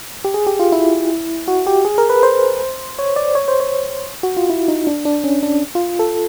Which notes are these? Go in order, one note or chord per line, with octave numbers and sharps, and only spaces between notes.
G4
G#4
G4
F4
E4
F#4
G4
G#4
A#4
B4
C5
C#5
D5
C#5
C5
C#5
F#4
F4
E4
D#4
D4
D4
C#4
D4
F4
A4